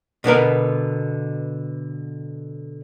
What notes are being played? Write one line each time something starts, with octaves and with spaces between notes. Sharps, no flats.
B2 D3 B3 A#4